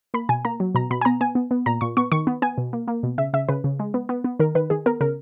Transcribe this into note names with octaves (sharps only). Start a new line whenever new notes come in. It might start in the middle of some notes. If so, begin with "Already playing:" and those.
A#3 B5
B2 G#5
A#3 A#5
F#3
B2 A#5
B2 B5
G#5
B3 A#5
B3 G#5
B3
B3
A#2 A#5
A#2 C#6
B3 C#6
D#3 C#6
B3
B3 G#5
B2
A#3
A#3
B2
C#3 E5
C#3 E5
C#3 B4
C#3
G#3
B3
B3
B3
D#3 A#4
D#3 B4
D#3 G#4
B3 A#4
C#3 A#4